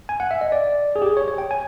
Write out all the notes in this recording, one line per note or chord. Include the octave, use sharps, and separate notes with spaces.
G#5
F#5
E5
D#5
D5
G#4
G4
G#4
C#5
C#5
G5
G#5